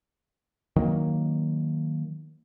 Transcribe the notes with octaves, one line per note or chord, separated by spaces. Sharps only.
D#3 F#3 A#3